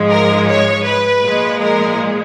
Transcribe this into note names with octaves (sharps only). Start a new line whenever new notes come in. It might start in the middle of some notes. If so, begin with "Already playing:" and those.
Already playing: G#2 F3 G#3
A#4
C#5
B4
A#2 F3 G#3
A#4